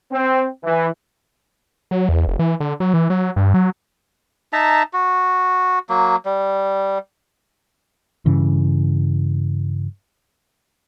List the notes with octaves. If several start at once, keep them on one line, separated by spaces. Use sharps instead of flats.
C4
E3
F#3
E2
F1
E3
D3
F#3
E3
F#3
G2
F#3
D#4 E5 A5 A#5
F#4
F#3 A#3
G3
G2 C#3 E3